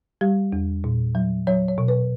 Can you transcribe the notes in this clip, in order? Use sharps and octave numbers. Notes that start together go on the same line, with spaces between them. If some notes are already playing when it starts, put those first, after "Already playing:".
G3 G4
E2
A#2
F#3
F#3 C#5
C#5
B2
B4